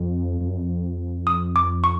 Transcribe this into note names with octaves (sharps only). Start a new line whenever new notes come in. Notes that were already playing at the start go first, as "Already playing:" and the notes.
Already playing: F2
F2
F#2
F2
D#6
D6
C#6